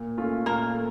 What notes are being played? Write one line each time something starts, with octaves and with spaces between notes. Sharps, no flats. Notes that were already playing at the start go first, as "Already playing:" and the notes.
Already playing: A#2
A3 C#4 F4
A#2 A#3 A#4
A3